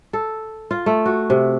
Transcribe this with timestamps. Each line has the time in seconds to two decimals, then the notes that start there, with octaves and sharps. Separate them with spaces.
0.13 A4
0.71 F4
0.86 A3
1.06 F#4
1.30 C3